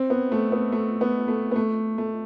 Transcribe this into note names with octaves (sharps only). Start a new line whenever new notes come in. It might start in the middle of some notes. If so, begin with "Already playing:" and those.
Already playing: C4
B3
A3
B3
A3
B3
A3
B3
A3
A3